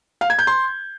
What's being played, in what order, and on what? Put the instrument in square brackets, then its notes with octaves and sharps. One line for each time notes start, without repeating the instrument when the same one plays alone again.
[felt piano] F5
G#6
G6
C6